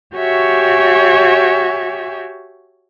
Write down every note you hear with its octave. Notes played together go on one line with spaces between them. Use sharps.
F#4 G4 C#5 E5 G#5